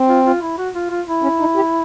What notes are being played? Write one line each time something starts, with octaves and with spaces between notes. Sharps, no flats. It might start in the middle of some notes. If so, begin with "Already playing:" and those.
Already playing: C4
F4
F4
E4
F#4
F4
F4
E4
C#4
D#4
G4